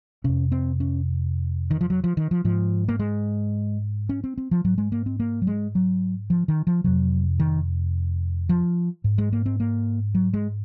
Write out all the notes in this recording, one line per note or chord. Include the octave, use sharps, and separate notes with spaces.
F2 C3 C#4
C4
C#4
D#3
F3
F#3
F3
D#3
F3
G#2 F3
A#3
G#3
C#4
C4
C4
F3
G#2 F#3
G#3
A#3
C4
A#3
F#3
G#3
F#3
F3
D#3
F3
F2 C3 F#3
D#3
F3
G#2
G#3
A#3
C4
A#3
F#3
G#3